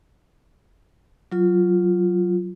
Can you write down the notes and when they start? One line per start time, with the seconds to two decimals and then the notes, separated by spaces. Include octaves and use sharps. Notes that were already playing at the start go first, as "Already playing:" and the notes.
1.32 F#3 F4